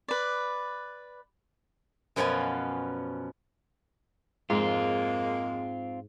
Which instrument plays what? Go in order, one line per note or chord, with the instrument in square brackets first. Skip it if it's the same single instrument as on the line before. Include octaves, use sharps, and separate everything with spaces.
[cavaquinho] B4 D5
[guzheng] F#2 B2 F3 B3 C#4 G#5
[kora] G#2 [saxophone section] G#3 A#3 [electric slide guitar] C4 F4